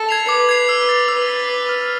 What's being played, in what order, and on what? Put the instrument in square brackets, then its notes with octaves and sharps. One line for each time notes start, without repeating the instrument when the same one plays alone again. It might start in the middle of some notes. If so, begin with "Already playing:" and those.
Already playing: [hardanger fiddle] A4
[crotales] G#6 C7 F7
[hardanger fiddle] B4 [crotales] D6
[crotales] G#6 C7 F7
E6
A6 C7
[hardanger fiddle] B4 [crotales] E6
[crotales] A6 C7
D6
F6 G#6